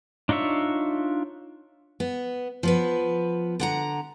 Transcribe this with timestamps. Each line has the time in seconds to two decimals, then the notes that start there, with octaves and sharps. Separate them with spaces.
0.29 D4 D#4 F4 C#5 E5
2.00 B3
2.63 F3 B3 B4
3.60 D3 F#5 A#5